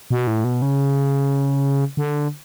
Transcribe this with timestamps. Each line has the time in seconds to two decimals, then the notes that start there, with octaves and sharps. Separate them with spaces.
0.10 B2
0.27 A2
0.44 B2
0.62 C#3
1.97 D3